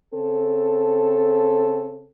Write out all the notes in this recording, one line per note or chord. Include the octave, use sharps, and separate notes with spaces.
C#3 C4 A4